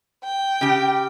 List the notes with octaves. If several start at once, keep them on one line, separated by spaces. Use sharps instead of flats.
G5
C#3 G4